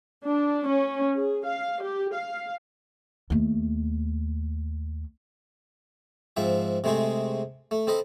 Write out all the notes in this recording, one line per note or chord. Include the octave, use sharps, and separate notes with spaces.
D4
C#4
G#4
F5
G4
F5
D#2 A3
G#2 F3 C4 E5
C3 G#3 A3 C4 G#4
A3
C4 A4 D#5 B5